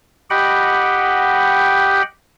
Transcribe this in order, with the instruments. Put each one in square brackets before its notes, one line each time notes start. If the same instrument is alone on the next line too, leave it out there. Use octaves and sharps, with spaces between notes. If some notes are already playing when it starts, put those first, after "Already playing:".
[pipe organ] G4 D#5 F#5 G5 B5